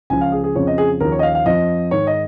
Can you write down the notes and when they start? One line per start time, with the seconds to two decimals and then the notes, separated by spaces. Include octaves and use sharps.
0.10 C#2 C#3 F3 G#5
0.21 F5
0.32 G#4
0.44 G#4
0.55 F2 C#3 F3 C#5
0.67 D#5
0.78 G#4
1.00 D#2 C#3 F3 A#4
1.12 C#5
1.19 D#5
1.23 F5
1.35 F5
1.46 F2 F3 D#5
1.91 G#2 D#3 C#5
2.07 D#5